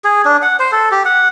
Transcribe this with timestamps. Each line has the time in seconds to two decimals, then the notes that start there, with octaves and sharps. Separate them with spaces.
0.04 G#4
0.25 D4
0.42 F#5
0.59 C5
0.72 A4
0.92 G4
1.05 F#5